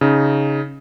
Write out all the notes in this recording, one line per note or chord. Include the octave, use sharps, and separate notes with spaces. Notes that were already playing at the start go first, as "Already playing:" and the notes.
C#3 D#4